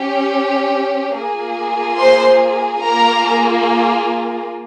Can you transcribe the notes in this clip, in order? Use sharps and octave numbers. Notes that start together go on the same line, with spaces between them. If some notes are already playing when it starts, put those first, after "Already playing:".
Already playing: C#4 G4
A#3 F4 G#4
C5 C6
A#3 F4 G#4 A#4 A#5